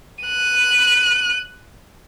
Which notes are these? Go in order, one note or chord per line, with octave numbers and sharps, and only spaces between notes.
F#6 D#7